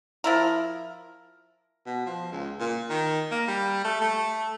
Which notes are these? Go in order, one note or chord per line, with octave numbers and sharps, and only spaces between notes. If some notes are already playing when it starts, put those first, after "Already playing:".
F3 E4 A#4
B2
F3
C#2
A#2
D#3
A#3
G3
A3
A3